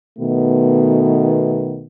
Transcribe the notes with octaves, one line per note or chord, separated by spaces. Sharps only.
B2 D#3 A3 B3